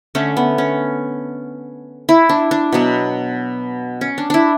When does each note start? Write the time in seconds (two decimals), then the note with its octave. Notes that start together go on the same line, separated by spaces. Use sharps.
0.15 D3 A3 C#4
0.37 B3
0.58 C#4
2.09 E4
2.29 D4
2.51 D4
2.72 B2 F#3 B3
4.01 C#4
4.18 D4
4.30 D4 E4